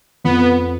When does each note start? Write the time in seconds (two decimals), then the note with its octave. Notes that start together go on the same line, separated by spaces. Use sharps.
0.24 F2 B3